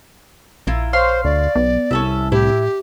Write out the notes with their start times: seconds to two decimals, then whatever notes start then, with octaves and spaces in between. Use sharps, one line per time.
0.67 A#1 E4 F4 A#4
0.93 C5 C#5 F5 C6
1.24 D2 D5
1.56 B1 B3
1.91 C2 C#4 A4 E5
2.32 A2 E4 G4